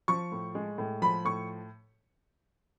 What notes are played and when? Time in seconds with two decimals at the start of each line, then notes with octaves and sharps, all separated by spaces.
0.08 F3 C#6
0.32 A2
0.55 G#3
0.78 A2
1.02 F3 B5
1.25 A2 C#6